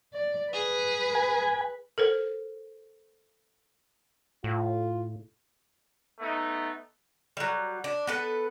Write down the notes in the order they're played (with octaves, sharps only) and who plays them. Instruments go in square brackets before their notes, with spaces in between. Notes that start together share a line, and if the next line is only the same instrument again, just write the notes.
[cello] D5
[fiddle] G#4 [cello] B4
[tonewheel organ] G#5
[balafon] A4 A#4 C5
[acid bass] A2 [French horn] F4
[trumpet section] A3 B3 D#4
[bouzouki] F#3 G3
D4
B3 A4 B4